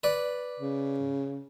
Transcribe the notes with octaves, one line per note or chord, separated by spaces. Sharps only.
B4 D5
C#3